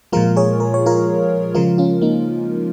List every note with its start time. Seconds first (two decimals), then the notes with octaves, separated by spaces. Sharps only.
0.12 A#2 F3 G#3 F4 A#4
0.36 G#4 C#5
0.60 A#4
0.74 C#5
0.86 F4 A#4
1.54 C#3 F3 G#3 F4 A#4
1.78 C#4 F4
2.01 A#3 D#4